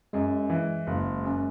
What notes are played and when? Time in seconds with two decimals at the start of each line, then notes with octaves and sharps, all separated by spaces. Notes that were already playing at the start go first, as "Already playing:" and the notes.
0.13 F#2 G#3
0.50 E3
0.87 F#1
1.24 F#2